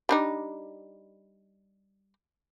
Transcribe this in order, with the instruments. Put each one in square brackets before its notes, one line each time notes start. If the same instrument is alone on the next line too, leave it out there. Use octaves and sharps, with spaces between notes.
[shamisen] G3 D4 D#4